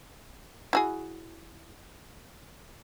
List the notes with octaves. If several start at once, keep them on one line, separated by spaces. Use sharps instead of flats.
E4 F#4 G#4